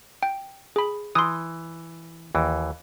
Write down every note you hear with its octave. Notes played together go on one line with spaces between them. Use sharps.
G5
G#4 B5
E3 C6 D#6
D#2 E3